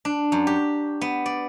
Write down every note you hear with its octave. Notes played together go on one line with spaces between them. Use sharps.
D4
F#2
G4
B3
D5